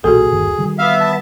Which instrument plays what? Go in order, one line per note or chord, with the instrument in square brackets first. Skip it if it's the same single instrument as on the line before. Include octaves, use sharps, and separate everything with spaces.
[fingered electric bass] B1 A#2 E3 [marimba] F#4 A4 [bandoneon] G#4
[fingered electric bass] G1 D#2
D#3 E3 G3
[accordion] B3 E5 [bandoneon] F5
[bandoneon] A5